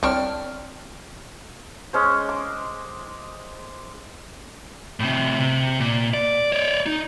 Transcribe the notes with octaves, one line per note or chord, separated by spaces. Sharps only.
C2 C4 D4 C#5 G5 F6
G#3 C#4 C5
D6
A2 C3
C3
A#2
D5
C#5 D5
D#4